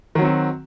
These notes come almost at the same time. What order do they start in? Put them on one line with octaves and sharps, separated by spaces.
D#3 F#3 C4 F#4